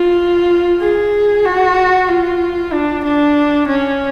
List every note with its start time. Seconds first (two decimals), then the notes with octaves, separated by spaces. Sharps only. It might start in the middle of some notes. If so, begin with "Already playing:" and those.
Already playing: F4
0.82 G#4
1.45 F#4
2.08 F4
2.73 D4
3.04 D4
3.67 C#4